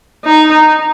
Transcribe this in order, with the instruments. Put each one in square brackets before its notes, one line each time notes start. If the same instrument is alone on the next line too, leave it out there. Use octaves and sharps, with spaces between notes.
[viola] D#4